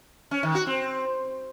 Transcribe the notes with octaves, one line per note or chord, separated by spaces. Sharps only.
C#4
D#3
F#4
C4